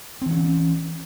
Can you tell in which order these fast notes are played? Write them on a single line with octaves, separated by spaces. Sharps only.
C4 E3 C#4